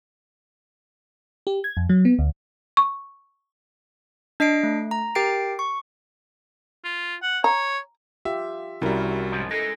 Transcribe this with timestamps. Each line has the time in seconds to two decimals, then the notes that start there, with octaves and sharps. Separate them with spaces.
1.47 G4
1.64 G#6
1.77 F2
1.89 F#3
2.05 B3
2.19 D2
2.77 C#6
4.40 D4 D#5 B6 C7 D7
4.63 A3
4.91 A#5
5.15 G4 A#4 G5 A6 C7 D7
5.59 C#6
6.84 F4
7.23 F#5
7.44 C#5 A#5
8.25 F4 G4 E5
8.82 C2 G3 C#4 E4 F#4 A#4
9.32 G#2 F3
9.51 G#3 D#4 A4